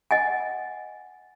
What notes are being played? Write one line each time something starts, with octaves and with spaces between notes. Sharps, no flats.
D#5 F#5 G#5